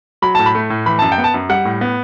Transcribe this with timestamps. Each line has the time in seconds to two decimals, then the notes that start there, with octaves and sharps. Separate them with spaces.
0.22 F#3 B5
0.35 A2 A5
0.46 B5
0.55 A3
0.70 A2
0.86 E3 B5
0.99 F#2 A5
1.12 G5
1.18 B3
1.24 A5
1.34 F#2
1.49 G3 F#5
1.65 A2
1.81 B3